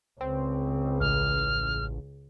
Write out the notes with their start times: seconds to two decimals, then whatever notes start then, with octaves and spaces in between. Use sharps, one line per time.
0.21 C#2 C4
1.01 A1 F6